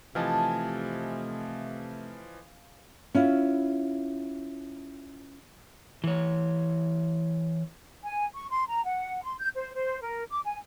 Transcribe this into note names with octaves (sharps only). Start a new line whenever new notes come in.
C3 E3 F3 A3 D#5 F5 G#5 A5
C#4 E4 F4
E3 C#5
G#5
C#6
C6
A#5
F#5
C6
G6
C5
C5
A#4
D6
G#5